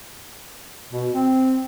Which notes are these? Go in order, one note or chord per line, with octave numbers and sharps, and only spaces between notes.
B2
C4